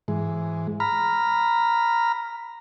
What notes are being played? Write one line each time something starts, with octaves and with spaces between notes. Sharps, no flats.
G#2 E3 G#3
A#5 B5 F6